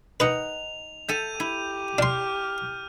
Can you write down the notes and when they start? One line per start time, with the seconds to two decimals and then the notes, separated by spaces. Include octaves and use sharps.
0.20 D#4 B4 D#5 F#5 F7
1.09 A4 E5 G6 D#7 F7
1.40 E4 G4
1.98 D4 C6 F6